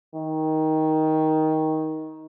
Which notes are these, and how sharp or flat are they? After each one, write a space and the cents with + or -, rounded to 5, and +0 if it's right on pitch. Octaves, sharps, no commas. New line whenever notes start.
D#3 +15